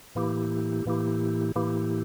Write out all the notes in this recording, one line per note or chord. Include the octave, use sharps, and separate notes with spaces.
A2 E3 A#3 E4 G4
A2 E3 A#3 E4 G4
A2 E3 A#3 E4 G4